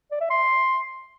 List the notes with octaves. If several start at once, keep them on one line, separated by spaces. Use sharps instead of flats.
D5
E5
C6